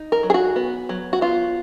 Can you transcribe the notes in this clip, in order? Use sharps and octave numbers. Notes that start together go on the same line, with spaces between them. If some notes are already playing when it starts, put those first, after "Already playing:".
Already playing: D#4
A#4
F#3
G#4
F#4
B3
F#3
F#4
B3 F4